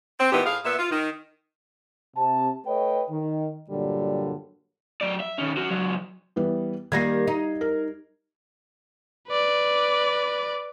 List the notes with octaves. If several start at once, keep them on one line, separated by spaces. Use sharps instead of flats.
C4
A#2 E3 B3 D#4 G4
A2 G#4 F5
A#2 B3 E5
F4
D#3
C3 A5
A3 B4 C#5 D#5 G5
D#3
G2 A#2 D3 F#3 G3
F#3 D5
E5
D#3 C#4
C#4 F#4
C#2 F#3
E3 G3 B3
D#3 G3 A#3 G#6 A#6 C7
D#4
A#4
B4 D5